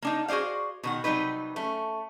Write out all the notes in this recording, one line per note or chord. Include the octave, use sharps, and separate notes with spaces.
A#3 D4 D#4
F#4 G#4 C5 D5 F5
B2 D#3 F#5
C3 F#3 G3 D#4 B4
A3 C#4